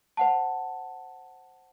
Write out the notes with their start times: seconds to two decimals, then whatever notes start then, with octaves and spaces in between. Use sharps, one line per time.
0.17 C5 F#5 A5